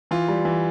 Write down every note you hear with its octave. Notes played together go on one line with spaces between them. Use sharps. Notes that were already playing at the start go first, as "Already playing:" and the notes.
E3 F4
G3
E3